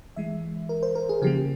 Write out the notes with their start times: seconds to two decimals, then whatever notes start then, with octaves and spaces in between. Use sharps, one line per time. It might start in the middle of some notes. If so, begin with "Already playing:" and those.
0.16 E3 G#3 E5
0.69 A#4
0.83 C5
0.95 A#4
1.09 G#4
1.22 C#3 F3 A#3 G4